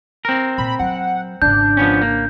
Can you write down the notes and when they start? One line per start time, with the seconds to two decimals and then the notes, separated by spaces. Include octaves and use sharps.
0.25 C4 A#4
0.58 A#2 B5
0.79 F#3 F#5
1.42 G#1 C#3 D4 G6
1.77 F3 B3 C#4
2.02 A#3